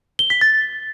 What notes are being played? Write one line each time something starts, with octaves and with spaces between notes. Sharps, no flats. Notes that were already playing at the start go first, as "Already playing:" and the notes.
G7
B6
A6